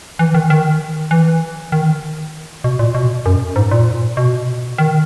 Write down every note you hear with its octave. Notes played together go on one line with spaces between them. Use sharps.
E3
D#3
D#3
E3
D#3
B2
A#2
B2
F#2
G#2
A#2
B2
D#3